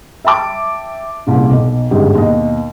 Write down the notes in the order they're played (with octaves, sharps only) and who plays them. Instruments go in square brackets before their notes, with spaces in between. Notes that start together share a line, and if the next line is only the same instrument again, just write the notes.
[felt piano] E5 G5 A5 D6
C2 A#2 C#3
B1 B2
G1 G#2 C#3 G4
D#2 B2 D#5